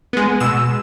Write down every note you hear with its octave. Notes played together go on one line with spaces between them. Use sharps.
G#3 B3
B2 E6